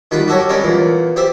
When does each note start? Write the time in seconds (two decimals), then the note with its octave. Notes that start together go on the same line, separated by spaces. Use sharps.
0.11 D#3 G3 F4 F#5 B5
0.28 F#4 G4 A4 A#4 C#5
0.49 G3 G#3 C#4 A#4 D5
0.64 E2 A#2
1.16 G4 C5 D5 E5